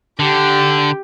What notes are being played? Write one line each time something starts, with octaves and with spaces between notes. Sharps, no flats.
D3 G4